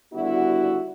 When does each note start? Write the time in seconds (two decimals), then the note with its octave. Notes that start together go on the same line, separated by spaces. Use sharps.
0.12 D#2 D3 G3 B3 E4 F#4